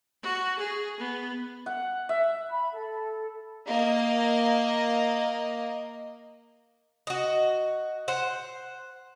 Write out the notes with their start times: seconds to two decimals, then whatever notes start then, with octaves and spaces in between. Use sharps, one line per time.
0.23 F#4
0.59 G#4
1.00 B3
1.66 F#5
2.09 E5
2.51 B5
2.73 A4
3.68 A#3 D#5
7.07 F#4 D#5
8.08 C5 F#5